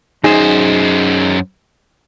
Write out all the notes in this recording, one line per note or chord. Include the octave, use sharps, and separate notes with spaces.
F#2 D#4 G#4 C5